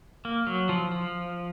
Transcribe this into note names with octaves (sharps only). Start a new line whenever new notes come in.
A#3
F#3
F3
F3